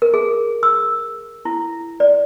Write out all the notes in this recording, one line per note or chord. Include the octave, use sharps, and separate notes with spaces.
A#4
G#4
E6
E4
D5